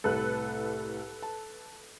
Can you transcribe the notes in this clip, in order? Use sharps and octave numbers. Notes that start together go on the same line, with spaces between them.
C2 A2 A4 B4 F#6
A5